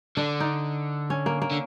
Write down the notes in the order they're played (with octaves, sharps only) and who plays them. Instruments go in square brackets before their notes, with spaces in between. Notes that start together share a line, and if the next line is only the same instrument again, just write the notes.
[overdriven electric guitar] D3 [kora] D4
[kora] D#4
C#4
A#3
A#3
[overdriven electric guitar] D3